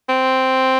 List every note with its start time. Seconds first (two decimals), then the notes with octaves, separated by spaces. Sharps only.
0.09 C4